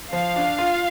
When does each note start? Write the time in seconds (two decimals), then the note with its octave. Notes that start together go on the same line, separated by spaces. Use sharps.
0.13 F3 F5
0.36 D4
0.58 F4